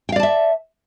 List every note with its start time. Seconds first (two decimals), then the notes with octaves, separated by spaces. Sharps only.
0.09 G5
0.12 F5
0.16 D5
0.20 A5
0.23 E5